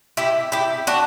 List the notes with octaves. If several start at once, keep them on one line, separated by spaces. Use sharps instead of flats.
E4 G4
E4 G4
D4 F#4